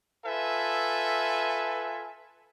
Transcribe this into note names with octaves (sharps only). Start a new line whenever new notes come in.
F4 A4 B4 E5 G#5